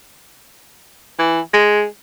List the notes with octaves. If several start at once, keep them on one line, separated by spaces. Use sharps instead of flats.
E3
G#3